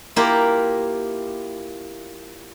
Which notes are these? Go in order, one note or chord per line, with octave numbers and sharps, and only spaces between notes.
A#3 E4 F4 G4 A#4